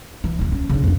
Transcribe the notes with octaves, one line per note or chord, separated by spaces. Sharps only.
E3
D#1 E2
C#4
C#3 D4
F2 D4